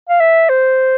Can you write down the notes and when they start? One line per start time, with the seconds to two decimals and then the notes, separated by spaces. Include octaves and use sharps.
0.09 F5
0.20 E5
0.49 C5